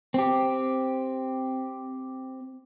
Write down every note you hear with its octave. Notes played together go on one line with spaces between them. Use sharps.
C4 G4